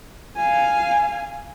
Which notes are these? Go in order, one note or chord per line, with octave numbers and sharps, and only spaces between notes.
F5 G#5